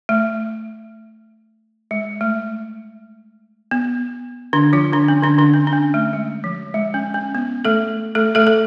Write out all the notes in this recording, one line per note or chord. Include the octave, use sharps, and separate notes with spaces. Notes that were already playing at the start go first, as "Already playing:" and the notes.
A3
G#3
A3
B3
D3 D4
F3 F4
D3 D4
C#4
D3 D4
D3 D4
C#4
D4
C#4
A3
G#3
F3
G#3
C#4
C#4
B3
A3 A4
A3 A4
A3 A4
A4